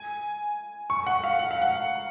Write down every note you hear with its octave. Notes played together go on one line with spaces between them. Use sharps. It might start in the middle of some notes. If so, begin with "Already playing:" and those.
Already playing: G#5
C#6
F#5
F5
F#5
F5
F#5